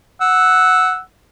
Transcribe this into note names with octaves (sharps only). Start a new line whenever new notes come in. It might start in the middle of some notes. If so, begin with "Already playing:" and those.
F#5 E6